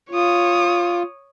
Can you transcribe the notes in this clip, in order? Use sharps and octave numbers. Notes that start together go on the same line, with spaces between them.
F4 C#5 D#6